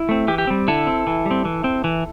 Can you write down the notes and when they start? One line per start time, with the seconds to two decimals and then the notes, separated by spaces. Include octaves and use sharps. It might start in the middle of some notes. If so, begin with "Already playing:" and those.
Already playing: E4
0.09 A3 C4
0.28 E3 G4
0.38 G4
0.47 G3 C4
0.68 D3 E4 A4
0.87 C4
1.07 E3
1.26 G3 C4
1.45 E3
1.64 C4
1.84 E3